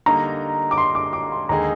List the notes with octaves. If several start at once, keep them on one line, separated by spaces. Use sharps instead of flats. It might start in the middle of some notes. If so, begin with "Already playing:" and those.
D3 G3 A#3 D#4 A#5
D6
C6
D6
D6
C6
D#2 D3 G#3 D#4 G#4 A#5